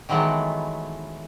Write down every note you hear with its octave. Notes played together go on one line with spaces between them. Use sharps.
D#3 E3 F#3 G#3 A3 B3